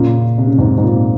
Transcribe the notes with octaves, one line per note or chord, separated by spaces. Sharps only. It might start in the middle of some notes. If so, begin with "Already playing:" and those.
Already playing: A#2 C#3
C3
C#3
G#2 C3
G#2
A#2